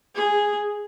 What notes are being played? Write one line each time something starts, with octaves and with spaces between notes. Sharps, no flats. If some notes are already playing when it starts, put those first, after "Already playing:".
G#4